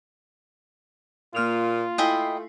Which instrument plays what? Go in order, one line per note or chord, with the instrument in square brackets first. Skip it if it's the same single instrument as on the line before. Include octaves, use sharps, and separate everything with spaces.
[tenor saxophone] A#2 [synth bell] A#3 F6 F7 [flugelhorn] F4
[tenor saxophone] A3 [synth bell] E4 G#5 C7 [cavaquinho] D#5 G5 B5